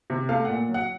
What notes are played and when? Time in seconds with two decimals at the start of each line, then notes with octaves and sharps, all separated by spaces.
0.10 C3
0.29 A3 F5
0.45 A#2 F#5
0.69 F#3
0.74 F#5